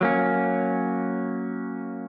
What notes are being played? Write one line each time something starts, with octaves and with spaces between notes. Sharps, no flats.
F#3 A#3 C#4